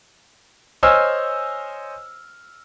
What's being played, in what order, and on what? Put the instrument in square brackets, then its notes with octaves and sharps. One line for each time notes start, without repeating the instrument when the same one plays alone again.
[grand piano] C5 C#5 D#5 G#5 E6 F6